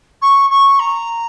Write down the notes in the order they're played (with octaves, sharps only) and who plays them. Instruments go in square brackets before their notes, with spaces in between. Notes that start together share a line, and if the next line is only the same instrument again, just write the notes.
[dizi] C#6
C#6
A#5